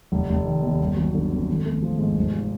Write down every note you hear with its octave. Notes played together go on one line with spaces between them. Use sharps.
F1
F1
D#3
D#2
G1
F#3
D3
F2
G#1
A3
F3
G#2
F1
F3